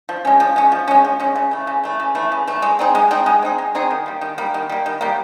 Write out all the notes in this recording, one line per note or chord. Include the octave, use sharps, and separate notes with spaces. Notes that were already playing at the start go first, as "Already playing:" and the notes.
F3
G#3 C#4
F3
G#3 C#4
F3
G#3 C#4
F3
G#3 C#4
C#3
E3 A3
C#3
E3 A3
C#3
E3 A3
C#3
E3 A3
G#3
C4 D#4 G#4
G#3
C4 D#4 G#4
G#3
C4 D#4 G#4
G#3
C4 D#4 G#4
D#3
G3 A#3
D#3
G3 A#3
D#3
G3 A#3
D#3
G3 A#3